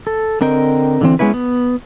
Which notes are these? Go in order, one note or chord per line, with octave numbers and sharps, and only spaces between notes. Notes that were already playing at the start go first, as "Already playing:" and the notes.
A4
D3 C4 A#4 D#5 G5
D3 E3 C4
G#3 B3 C#4 E4 B4
B3